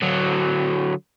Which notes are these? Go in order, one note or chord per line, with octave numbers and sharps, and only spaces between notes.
D3 F#3